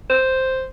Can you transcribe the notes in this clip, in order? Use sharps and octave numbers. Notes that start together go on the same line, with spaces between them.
C5